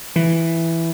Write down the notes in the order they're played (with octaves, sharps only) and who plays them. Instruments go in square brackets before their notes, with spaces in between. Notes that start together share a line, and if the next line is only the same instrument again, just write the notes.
[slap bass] E3